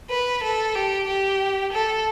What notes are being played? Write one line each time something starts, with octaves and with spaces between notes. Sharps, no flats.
B4
A4
G4
G4
A4